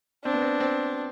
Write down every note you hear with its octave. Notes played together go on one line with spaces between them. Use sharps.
C4 D4
B3
C4
C4